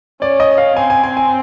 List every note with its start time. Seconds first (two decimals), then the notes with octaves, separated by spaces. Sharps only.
0.21 C#4 D5
0.40 D#5
0.58 F5
0.76 C4 G#5
0.90 G#5
1.03 G#5
1.17 G#5